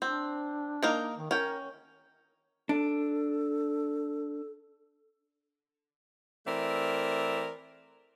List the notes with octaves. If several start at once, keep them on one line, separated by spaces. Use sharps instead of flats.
C4 D4
A#3 D#4 A#4
D#3
C#4 A#4 G5
D4 A4
E3 A3 C4 A#4 D5 E5